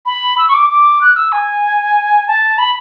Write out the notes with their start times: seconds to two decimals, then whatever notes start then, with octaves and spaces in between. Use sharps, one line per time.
0.06 B5
0.38 E6
0.49 C#6
0.54 D6
0.69 D6
1.01 F#6
1.16 E6
1.32 G#5
2.28 A5
2.58 B5